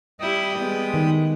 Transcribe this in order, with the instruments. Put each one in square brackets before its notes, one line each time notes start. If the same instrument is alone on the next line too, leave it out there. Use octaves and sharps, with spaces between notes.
[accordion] G3 G5 D#6 [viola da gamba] E4 G4
[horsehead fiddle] G#3 [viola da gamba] B3
[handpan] D#3